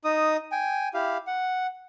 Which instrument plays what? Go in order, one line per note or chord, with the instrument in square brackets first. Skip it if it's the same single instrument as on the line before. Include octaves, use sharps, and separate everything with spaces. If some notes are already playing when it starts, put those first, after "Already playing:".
[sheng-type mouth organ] D#4 D#6
G5 G#5
E4 G4 F5
F#5